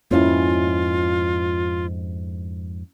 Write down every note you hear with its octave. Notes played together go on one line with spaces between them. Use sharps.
F2 G#2 A#3 C#4 E4 F4